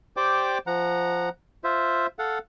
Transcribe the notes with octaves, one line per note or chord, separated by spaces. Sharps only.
G4 C5 D5 G5 D6
F3 F#5 A#5
F4 C5 E5
A4 F5 F#5